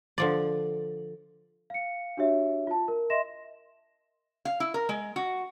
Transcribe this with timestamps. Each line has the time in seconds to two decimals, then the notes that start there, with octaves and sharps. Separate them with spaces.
0.18 D3 F3 D5
1.70 F5 C#7
2.17 D4 F#4 G4 C#5 E5
2.67 F4 A5
2.88 A#4
3.10 D#5 E5 C6 A#6 E7
4.45 F5
4.60 E4
4.74 A#4
4.89 G#3
5.16 F#4